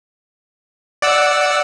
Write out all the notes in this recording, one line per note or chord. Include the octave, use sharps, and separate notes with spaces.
D5 F#5 E6